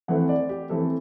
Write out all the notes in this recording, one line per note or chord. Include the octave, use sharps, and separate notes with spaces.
E3 A3 C4 F#5
D5
G4
E3 A3 C4 A4